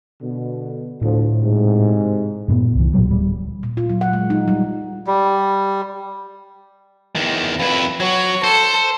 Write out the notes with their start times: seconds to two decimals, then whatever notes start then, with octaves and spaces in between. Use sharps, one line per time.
0.21 B2 D3
1.01 D2 A2 F3
1.42 G#2 C3
2.48 G2 A#2 A#3 B3
2.75 C2 E3
2.93 A#2 C#3 F#3 G3
3.08 D1 G3
3.63 A#2
3.77 F4
3.90 F#3
4.01 F#5
4.13 G#3
4.30 D#4
4.48 G3
5.07 G3
7.16 E2 D#3
7.60 F2 E4 B4
8.00 F#3 C#5
8.44 A4 C5